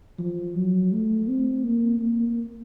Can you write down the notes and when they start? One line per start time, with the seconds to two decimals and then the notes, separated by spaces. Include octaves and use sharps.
0.19 F3
0.55 F#3
0.92 A3
1.28 C4
1.64 A#3
2.01 A#3